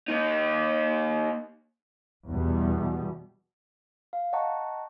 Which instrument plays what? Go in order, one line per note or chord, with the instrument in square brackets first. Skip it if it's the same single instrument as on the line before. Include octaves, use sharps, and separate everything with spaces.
[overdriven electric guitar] A#3 D#4
[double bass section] E2 B2 G3
[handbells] F5
D#5 F#5 G5 A5 A#5 C#6